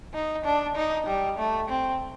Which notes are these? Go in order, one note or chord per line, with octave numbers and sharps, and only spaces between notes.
D#4
D4
D#4
G3
A3
C4